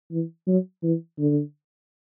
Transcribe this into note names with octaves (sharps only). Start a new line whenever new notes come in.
E3
F#3
E3
D3